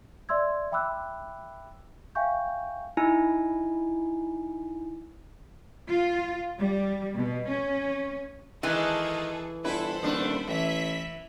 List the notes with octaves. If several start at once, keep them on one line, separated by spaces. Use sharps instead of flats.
D5 E5 C6 E6 G#6
E5 G5 B5 D6 E6 F#6
E5 F5 G5 G#5 C#6 G6
D#4 E4 G#5
F4
G3
B2
C#4
D#3 E3 G#3 G#4 A4 G#5
G1 E4 A4 B4 C5 B5
D#1 D3 A3 D4
A1 E3 E5 B6